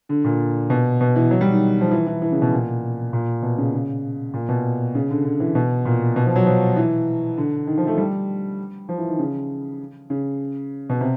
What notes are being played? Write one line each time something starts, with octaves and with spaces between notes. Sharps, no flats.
D3
A#2
B2
B2
E3
F#3
G3
D#3
F3
E3
E3
E3
C#3
B2
A#2
A#2
B2
C#3
C#3
A#2
B2
C#3
D3
D3
E3
B2
A#2
B2
F3
F#3
F3
E3
D3
D#3
F3
A3
G3
F3
E3
D#3
C#3
C#3
B2
C3